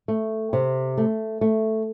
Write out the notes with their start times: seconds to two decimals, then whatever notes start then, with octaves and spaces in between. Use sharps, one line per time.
0.08 A3
0.53 C3
0.98 A3
1.41 A3